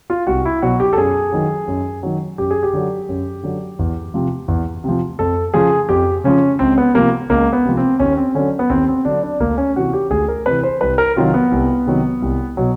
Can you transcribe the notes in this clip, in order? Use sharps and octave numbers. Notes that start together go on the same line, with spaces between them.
F4
C2 F#4
E4
B2 F#3 F#4
G4
A4
F#2 G#4
D#3 F#3
F#2
D#3 F#3
F#2 G4
G#4
G4
D3 F#3
F#2
D3 F#3
E2
C3 F3
E2
C3 F3
F2 A4
C#3 F3 G#4
F2 G4
C#3 F3 C#4
C#2 C4
B3
C3 F3 A#3
C#2 A#3
B3
C3 F3
C4
D#2 C#4
C4
D3 F#3 C#4
B3
D#2 C4
C4
D3 F#3 D4
D4
D2 A#3
C#4
C3 E3 F#4
G4
D2 G#4
A#4
C3 E3 B4
C5
C2 B4
A#4
C3 D#3 F#3 F4
B3
C2
C3 D#3 F#3
C2
B2 F#3